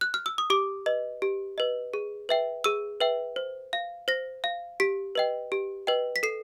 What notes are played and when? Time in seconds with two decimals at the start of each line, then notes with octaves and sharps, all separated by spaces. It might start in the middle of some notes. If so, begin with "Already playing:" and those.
0.01 F#6
0.14 F6
0.26 E6
0.38 D#6
0.50 G4 D6
0.86 B4 D#5
1.22 G4
1.58 B4 D#5
1.94 G#4
2.29 B4 E5 G5
2.64 G#4 E6
3.00 B4 E5 G5
3.36 C5
3.73 F5
4.08 C5 A#6
4.44 F5
4.80 G4 B6
5.15 B4 D#5 G5
5.52 G4
5.87 B4 D#5 G5
6.16 B6
6.23 A4 C7